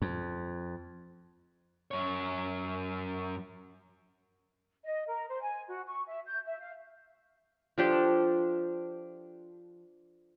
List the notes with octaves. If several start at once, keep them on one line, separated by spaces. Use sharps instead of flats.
F2
F#2 C#5
D#5
A#4
C5
G#5
F#4
C#6
E5
G6
E5
F5
F3 D4 G4 A4